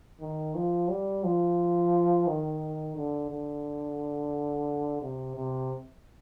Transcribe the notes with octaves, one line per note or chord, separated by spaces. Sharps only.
D#3
F3
G3
F3
D#3
D3
D3
C3
C3